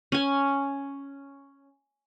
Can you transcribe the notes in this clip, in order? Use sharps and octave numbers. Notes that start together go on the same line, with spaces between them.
C#4 G#5